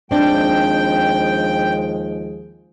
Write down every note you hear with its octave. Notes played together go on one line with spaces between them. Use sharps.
D#2 F3 G#3 C4 D4 G5